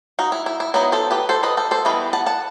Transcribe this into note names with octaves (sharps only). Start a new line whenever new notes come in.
D#4 F#4
E4
E4
E4
F#3 B3 D#4 E4
A4 C5
G4 B4
A4 C5
B4 D#5
A4 C5
A4 C5
E3 G3 B3 B4 D#5
F#5 A5
F#5 A5